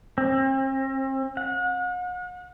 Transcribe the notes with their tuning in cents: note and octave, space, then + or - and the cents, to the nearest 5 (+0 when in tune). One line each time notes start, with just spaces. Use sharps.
C4 +40
F#5 -40